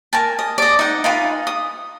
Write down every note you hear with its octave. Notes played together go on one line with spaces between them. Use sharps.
A#4 G#5 A5
D#5
D5 D#5
D#4 F#5
D#4 F4 B4 G#5
D#6